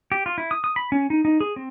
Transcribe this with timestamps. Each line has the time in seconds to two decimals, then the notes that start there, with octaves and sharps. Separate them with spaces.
0.12 G4
0.26 F4
0.38 E4
0.51 D#6
0.64 D#6
0.76 B5
0.92 C#4
1.10 D#4
1.25 D#4
1.40 G#4
1.56 C4